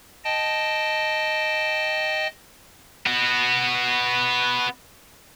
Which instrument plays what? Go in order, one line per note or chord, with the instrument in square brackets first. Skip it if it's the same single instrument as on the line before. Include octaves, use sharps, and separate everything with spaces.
[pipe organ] D#5 G5 A5
[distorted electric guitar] B3 F#4